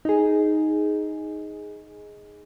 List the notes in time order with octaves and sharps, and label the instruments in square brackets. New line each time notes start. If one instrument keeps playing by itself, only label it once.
[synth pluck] D#4 G#4